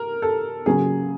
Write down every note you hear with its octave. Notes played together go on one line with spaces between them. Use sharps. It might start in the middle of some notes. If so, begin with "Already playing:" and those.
Already playing: A#4
A4
C#3 F#3 A#3 C#4 G#4